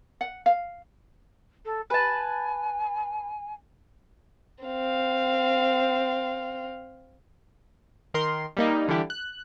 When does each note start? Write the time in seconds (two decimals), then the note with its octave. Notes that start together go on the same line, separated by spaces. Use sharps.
0.21 F#5
0.46 F5
1.65 A4
1.90 B4 G#5 A5
4.64 C4 F5
8.14 D#3 A#4 C6
8.57 G3 A#3 D#4
8.88 D3 E3 G3 E4 G4
9.10 F#6